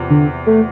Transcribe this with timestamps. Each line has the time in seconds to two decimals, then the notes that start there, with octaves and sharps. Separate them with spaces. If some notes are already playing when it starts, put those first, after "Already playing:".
Already playing: E2 C3 F3
0.10 D3
0.46 A3